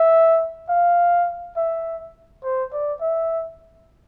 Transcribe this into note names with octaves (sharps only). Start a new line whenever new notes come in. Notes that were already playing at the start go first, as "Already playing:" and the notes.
Already playing: E5
F5
E5
C5
D5
E5